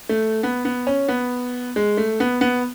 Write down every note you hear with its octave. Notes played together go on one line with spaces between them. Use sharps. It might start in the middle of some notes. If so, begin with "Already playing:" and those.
A3
B3
B3
C#4
B3
G#3
A3
B3
B3